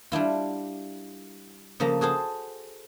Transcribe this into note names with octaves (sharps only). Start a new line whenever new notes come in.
G3 D4 E4 F4
C#3 F3 A#3 A4 A#5
F#4 G#4 A4 C5